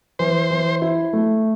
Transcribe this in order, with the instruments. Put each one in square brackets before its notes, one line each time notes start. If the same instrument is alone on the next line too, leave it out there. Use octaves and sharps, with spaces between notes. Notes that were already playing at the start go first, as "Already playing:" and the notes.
[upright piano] E3 [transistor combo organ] C5
[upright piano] E3
E4
A3